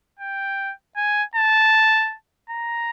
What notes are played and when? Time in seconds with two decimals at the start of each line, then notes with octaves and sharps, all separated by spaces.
0.19 G5
0.96 G#5
1.35 A5
2.50 A#5